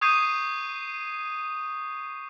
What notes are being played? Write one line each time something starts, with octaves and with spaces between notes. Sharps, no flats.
C#6 D#6 G6 G#6 C7 D#7